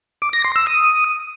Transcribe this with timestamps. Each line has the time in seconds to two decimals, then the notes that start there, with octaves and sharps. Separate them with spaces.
0.22 D6
0.33 A#6
0.44 C6
0.56 E6
0.67 D#6